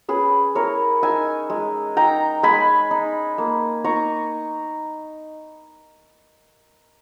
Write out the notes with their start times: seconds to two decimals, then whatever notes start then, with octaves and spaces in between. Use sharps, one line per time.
0.08 C#4 G#4 B4
0.55 E4 A#4 C#5
1.02 D#4 E5 G#5
1.50 G#3
1.97 D#4 G5 A#5
2.43 G#3 G#5 B5
2.91 D#4
3.38 A#3
3.84 D#4 A#5 C#6